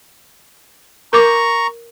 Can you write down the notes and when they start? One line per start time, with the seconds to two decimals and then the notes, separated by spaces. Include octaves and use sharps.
1.13 A#4 A#5 C#6 D6